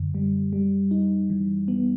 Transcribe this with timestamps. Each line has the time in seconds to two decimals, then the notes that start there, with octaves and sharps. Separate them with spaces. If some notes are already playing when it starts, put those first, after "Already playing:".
Already playing: F#2 D3
0.15 G3
0.53 G3
0.91 D#4
1.30 E3
1.68 B3